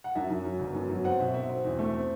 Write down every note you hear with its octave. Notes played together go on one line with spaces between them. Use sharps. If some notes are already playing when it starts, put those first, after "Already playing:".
F#5
F#2 E5
F#2
F#3
G1
F#2
F#3
C4 F#5
B2 E5
C4 E5
C4
E2
A3
C4